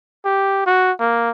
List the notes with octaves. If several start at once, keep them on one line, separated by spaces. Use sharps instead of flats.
G4
F#4
A#3